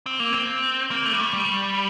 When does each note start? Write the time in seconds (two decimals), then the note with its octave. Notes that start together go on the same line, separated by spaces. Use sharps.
0.06 C4
0.20 A#3
0.33 C4
0.91 A#3
1.06 A3
1.13 G3
1.20 A3
1.34 G3